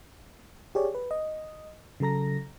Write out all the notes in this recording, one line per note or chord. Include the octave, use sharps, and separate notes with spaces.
G4 G#4 C#5 D5
B4
D#5
C#3 F#3 A4 A#5 A#6